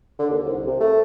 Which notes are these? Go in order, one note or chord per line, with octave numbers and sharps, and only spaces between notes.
D3
D#2
C2
C3
A3